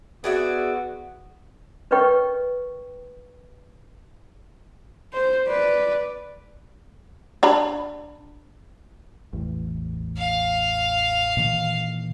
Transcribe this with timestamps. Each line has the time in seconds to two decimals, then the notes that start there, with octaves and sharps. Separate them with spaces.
0.24 B3 F#4 G#4 D5 E5
1.91 A#4 B4 C#5 D#5 G5 C#6
5.13 C5
5.47 B4 D5
7.43 D4 A#5 B5
9.33 A1 E2
10.17 F5
11.37 A#2 D#3 E3